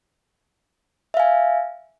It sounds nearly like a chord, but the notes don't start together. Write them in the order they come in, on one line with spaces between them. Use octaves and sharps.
E5 F5 G#5